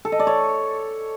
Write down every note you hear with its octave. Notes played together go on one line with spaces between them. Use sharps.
A4
D#5
D5
C#5